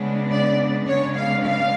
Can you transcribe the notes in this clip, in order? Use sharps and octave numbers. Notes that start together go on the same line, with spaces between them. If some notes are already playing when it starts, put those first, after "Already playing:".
Already playing: C#3 G#3 B3 D4
D5
C#3 G#3 B3 D4 C#5
F5
F5